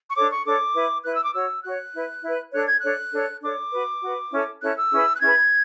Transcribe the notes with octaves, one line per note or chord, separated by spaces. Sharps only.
C#6
D4 A4 C#5 D6
C#6
D4 A4 C#5 D6
E4 B4
E4 B4 F#6
E6
D6
F#4 C#5 E6
F#4 C#5 F#6
E4 B4
E4 B4
D4 A4 C#5 F#6
G#6
D4 A4 C#5 F#6
D4 A4 C#5
D4 A4 C#5 D6
F#4 B4
F#4 B4
C#4 E4 A4 C#5
C#4 E4 A4 C#5 F#6
E6
C#4 E4 G#4 B4
F#6
C#4 E4 G#4 B4 G#6